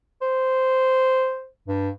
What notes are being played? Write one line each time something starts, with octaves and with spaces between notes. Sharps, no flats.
C5
G2